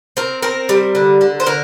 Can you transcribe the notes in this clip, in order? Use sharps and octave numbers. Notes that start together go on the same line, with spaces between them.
C4 A#4
C4 A#4
G3
D3
D3
C5
D3 A#4